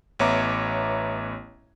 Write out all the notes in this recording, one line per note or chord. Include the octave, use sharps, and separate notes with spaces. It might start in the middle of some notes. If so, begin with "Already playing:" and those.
A1 B3 C#5 E5 A#5 D6